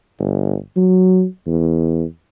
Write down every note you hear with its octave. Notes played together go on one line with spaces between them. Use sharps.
G1
F#3
E2